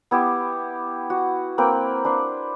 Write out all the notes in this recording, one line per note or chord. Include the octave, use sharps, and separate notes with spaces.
B3 E4 G4
F#4
A#3 C4 B4 G5
D4 B4 C5